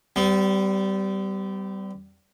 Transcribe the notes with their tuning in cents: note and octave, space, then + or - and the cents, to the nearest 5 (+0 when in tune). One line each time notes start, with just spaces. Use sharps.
G3 -15 B3 +45